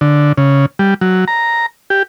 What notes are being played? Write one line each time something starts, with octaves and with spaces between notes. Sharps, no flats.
D3
C#3
G3
F#3
A#5
G4